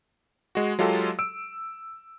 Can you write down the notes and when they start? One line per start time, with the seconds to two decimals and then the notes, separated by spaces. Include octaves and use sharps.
0.55 G#3 F#4
0.79 F#3 G#3 F4 G4 A4
1.19 E6 D7